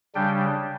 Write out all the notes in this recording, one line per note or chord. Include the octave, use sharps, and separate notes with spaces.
C#3 G3 D4 G5